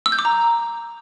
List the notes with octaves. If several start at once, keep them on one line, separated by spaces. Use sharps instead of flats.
E6
G6
D6
A#5